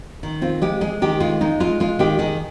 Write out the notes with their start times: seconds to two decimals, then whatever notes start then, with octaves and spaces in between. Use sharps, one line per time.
0.23 D#3
0.41 C4 F4
0.62 G#3 G4
0.81 G#3 G#4
1.02 D#3 G4
1.20 G#3 F4
1.41 G#3 D#4
1.60 G#3 F4
1.80 G#3 F4
1.99 D#3 G4
2.19 D#3 G#4